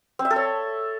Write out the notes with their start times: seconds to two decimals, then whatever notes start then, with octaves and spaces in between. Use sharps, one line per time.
0.19 C4
0.25 E5
0.31 A4
0.36 C#5